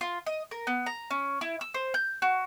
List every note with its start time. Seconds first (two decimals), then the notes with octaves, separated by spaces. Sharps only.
0.01 F4
0.26 D#5
0.51 A#4
0.67 B3
0.86 A#5
1.11 C#4
1.41 E4
1.61 E6
1.74 C5
1.94 G6
2.22 F#4